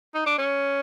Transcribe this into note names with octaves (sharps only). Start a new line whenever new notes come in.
D#4
D4
C#4